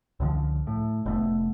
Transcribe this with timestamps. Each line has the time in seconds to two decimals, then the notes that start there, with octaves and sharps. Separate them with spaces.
0.20 C#2 D3 D#3 F3
0.67 A2
1.06 F1 A3 B3